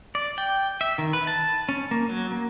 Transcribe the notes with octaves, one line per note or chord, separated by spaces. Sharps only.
D5
G5
E5
D#3
B4
A5
C#4
A#3
F#3
A#3